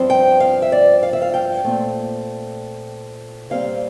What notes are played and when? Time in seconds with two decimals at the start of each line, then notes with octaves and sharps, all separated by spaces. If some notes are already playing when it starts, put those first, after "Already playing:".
Already playing: G2 F3 C4
0.10 G5
0.40 F5
0.62 E5
0.72 D5
1.03 F5
1.13 E5
1.22 F5
1.34 G5
1.64 A#2 A3 C4
3.50 A#2 G3 C4 F5